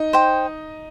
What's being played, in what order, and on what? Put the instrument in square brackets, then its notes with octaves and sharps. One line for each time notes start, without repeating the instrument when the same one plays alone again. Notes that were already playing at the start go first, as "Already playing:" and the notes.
Already playing: [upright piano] D#4 D#5
[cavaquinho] C5 G5